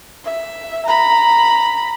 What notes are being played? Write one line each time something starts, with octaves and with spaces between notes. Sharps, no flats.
E5
A#5 B5